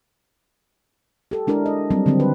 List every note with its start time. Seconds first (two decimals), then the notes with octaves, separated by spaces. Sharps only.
1.31 G4 A4
1.47 G#3 D4 E4 A#4
1.66 D#5
1.91 F#3 G3 C4
2.06 D3 D#3 F#3 C4
2.20 B4